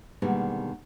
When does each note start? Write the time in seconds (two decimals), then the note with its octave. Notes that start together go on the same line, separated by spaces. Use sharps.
0.22 B2 D3 D#3 G3 G#3 A#3